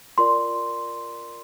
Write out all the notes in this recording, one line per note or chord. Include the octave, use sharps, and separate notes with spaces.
F4 A#4 D5 C6